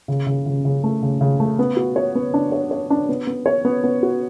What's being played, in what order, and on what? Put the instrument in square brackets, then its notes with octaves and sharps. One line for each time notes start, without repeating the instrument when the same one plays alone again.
[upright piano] C#3
C#3
C#3
C#3
A3
C#3
C#3
A3
B3
F#4
C#5
B3
D4
C#5
C#5
D4
B3
B3
C#5
B3
B3
F#4